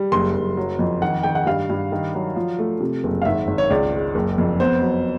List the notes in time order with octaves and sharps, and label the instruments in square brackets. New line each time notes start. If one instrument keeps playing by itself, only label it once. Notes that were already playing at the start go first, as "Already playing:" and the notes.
Already playing: [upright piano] G3
F#1 C6
F#1
F#3
F2
D#3 F#5
D#3 G5
F#5
G2 F5
G2
D#3
F#3
F3
A3
C3
F#1
F5
G#1 E5
G#1
C#5
C#2 D5
G#3
F#1
F2
B3 C5
F#3